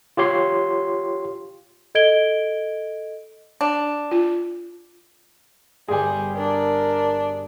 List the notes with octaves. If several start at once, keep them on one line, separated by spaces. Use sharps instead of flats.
F4 G4 C#5 C6
A4 D#5 G#6 D7 G7
D4
F4
G1 G2 G3 G#4 G#5 C6
D4 A#4